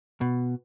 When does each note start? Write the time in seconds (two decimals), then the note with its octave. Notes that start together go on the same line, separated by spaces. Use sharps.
0.21 B2